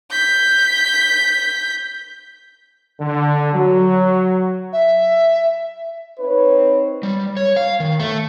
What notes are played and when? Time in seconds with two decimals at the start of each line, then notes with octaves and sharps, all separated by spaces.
0.11 G6 B6
3.00 D3
3.53 F#3
4.72 E5
6.19 C4 D#4 B4 C#5
7.03 G3
7.37 C#5
7.56 F5
7.80 D#3
8.00 A3